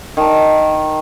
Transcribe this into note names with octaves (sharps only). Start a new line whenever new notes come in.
D#3 A5